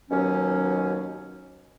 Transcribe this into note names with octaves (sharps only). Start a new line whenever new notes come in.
D#2 B2 F#3 C#4